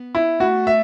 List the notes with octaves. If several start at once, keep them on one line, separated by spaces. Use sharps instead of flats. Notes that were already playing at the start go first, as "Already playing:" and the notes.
Already playing: B3
E4
A3 F#4
E5